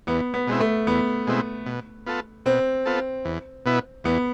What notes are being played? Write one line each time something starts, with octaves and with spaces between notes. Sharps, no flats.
E2 B3
B3
B2 G#3 C4 E4
A3
E2 B3
B2 G#3 C4 E4
B2
B3 F4 A4
B2 C4
B3 F4 A4
E2
B2 B3 E4
E2 B3